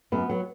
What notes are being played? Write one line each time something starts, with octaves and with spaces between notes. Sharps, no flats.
F#2 B3
F#3 B3